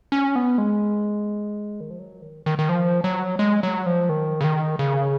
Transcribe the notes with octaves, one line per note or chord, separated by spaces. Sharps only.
C#4
B3
G#3
D#3
F3
F#3
D#3
D#3
D#3
F3
F#3
G#3
F#3
F3
D#3
C#3
D#3
C#3